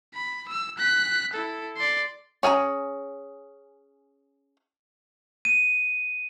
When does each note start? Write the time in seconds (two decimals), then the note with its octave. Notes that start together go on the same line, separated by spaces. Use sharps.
0.14 B5
0.48 E6
0.78 F#6 B6
1.33 E4 A4
1.77 D5 C6
2.43 C#4 G#4 G#5 A#5
5.45 D#7